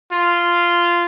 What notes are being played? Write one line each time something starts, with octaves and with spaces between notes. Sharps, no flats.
F4